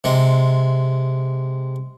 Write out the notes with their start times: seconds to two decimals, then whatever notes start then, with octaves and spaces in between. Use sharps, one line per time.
0.04 C3 G#3